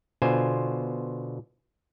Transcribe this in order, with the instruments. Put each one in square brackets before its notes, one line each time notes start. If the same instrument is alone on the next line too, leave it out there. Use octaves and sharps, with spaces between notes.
[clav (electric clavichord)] B2 D3 F4 C5 G#5